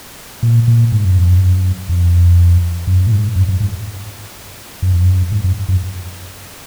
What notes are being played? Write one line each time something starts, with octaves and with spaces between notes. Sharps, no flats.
A#2
A#2
G#2
F#2
F2
F#2
F2
F#2
A#2
G#2
F#2
F#2
G#2
F#2
F2
F#2
G#2
F#2
F#2